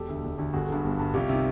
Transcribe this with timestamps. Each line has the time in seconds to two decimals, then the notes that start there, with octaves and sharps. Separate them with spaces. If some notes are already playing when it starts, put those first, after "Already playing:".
Already playing: E1 G4 A4
0.09 D2 D3
0.23 E1
0.38 D2 D3
0.53 G1 F#4 G#4
0.69 G2 D3
0.84 G1
0.99 G2 D3
1.14 C2 F4 G4
1.29 C3 D#3